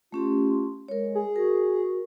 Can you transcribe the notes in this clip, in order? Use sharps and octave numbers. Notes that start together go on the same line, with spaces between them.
A3 C#4 F4 G4
G#3 A#4 C#5
G#4
F#4 A#4